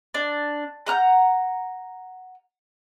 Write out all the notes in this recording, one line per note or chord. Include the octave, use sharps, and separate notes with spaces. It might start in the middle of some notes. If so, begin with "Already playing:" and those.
D4
F#5 A#5 F#6 G6